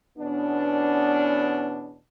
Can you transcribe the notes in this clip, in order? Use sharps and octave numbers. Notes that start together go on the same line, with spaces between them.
E2 B2 B3 C#4 D4